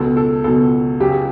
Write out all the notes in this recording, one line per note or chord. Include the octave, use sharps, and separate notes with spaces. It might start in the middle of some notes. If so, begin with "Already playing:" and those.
Already playing: C#2 B2 F#3 A4
A4
C#2 B2 F#3 A4
C#2 C#3 F#3 G4